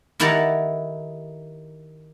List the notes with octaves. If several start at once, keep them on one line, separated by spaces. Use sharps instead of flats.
D#3 E4 G4 A4 F#5 A#5